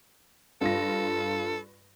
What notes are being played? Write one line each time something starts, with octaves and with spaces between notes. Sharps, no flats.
G2 F4 A4 A#6